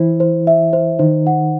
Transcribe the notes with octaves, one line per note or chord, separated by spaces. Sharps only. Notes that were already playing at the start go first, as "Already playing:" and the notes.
Already playing: E3 E4 C5
C5
E5
C5
D#3 D#4 C5
F#5